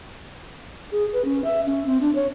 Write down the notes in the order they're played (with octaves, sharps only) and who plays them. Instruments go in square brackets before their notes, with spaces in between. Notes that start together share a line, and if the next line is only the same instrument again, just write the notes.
[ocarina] G#4
B4
C#4
E5
C#4
C4
D4
C#5